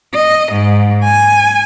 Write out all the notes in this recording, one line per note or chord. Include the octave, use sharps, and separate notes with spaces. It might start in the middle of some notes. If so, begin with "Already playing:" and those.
D#5
G#2
G#5